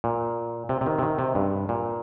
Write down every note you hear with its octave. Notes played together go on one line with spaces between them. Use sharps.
A#2
C3
C3
D#3
C3
D#3
C3
G2
A#2